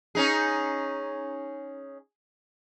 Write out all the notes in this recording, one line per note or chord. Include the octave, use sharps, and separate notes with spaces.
C#4 D#4 G#4